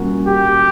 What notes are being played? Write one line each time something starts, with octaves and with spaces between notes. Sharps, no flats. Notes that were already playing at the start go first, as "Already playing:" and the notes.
Already playing: A#2 G3 C#4 F#4 A#4
G4